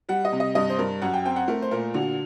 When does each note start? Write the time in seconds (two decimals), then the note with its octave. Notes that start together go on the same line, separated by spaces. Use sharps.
0.09 G3 F#5
0.25 D#5
0.32 C3
0.40 D#5
0.55 G2 D#5
0.70 C5
0.78 G2 A#4
1.02 F#2 F#5
1.14 G5
1.25 C4 G5
1.36 F#5
1.48 A3 A#4
1.62 C5
1.71 A#2 A#4
1.94 D3 F#4